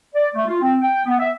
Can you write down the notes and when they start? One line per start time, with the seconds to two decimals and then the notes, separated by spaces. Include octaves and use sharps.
0.15 D5
0.35 A3
0.46 F4
0.61 C4
0.81 G5
1.05 B3
1.19 E5